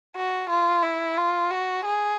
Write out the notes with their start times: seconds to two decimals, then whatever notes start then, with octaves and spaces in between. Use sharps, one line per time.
0.16 F#4
0.50 F4
0.83 E4
1.17 F4
1.51 F#4
1.85 G#4